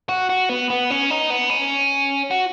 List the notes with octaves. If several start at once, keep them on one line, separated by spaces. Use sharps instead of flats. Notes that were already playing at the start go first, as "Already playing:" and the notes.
F#4
F#4
B3
B3
C#4
D#4
B3
C#4
F#4